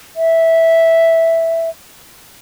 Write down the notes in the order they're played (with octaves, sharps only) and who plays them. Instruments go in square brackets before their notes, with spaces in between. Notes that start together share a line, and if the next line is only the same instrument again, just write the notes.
[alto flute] E5